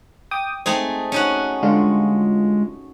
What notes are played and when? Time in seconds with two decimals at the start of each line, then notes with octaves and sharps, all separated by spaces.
0.31 G5 D6 D#6
0.66 A3 C4 D#4 G#4
1.12 C#4 D#4 F#4
1.63 D3 G3 G#3 F4